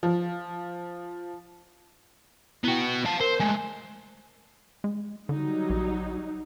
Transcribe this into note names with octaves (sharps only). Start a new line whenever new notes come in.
F3
B3 E4 F#4 G5
C#7 D7
F5 A5
A#4 C5
G#3 A3 G#5
G#3
D3 F#3 G3 D#4
A#1